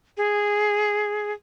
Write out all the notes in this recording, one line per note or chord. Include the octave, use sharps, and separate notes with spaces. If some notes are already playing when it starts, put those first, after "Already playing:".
G#4